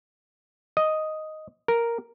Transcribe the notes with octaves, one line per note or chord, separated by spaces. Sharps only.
D#5
A#4